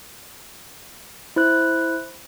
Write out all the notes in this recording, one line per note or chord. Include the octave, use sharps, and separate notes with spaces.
E4 C5 F#6